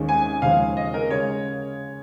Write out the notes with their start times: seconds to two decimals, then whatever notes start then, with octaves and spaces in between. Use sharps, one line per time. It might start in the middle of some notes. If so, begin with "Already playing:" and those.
Already playing: D#2 D#3 G#3 C#4
0.09 G#5
0.42 D#2 C#3 F3 G#3 C#4 F5
0.77 D#5
0.94 A#4
1.10 C#3 G#3 C#5